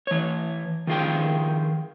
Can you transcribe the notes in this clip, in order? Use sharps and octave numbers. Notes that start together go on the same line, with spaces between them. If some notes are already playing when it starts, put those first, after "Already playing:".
E3 C#5
D#3 F3 F4 G#4 G5